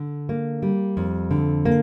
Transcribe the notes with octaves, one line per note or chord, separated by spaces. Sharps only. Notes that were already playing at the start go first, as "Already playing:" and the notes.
Already playing: D3
A#3
G3
F2
D3
A#3